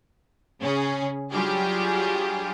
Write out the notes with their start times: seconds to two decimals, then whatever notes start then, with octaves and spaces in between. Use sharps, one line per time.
0.61 C#3 C#4 G#4
1.32 F#3 G3 D4 F4 G4 G#4